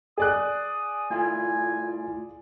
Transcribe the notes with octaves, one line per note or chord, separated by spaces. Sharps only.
G#4 D5 D#6 F#6
A3 E4 F4 G#5